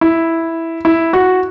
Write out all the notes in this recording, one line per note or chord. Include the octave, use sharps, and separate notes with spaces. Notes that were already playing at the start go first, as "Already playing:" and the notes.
E4
E4
F#4